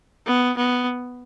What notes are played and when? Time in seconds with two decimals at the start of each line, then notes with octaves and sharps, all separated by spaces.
0.26 B3
0.57 B3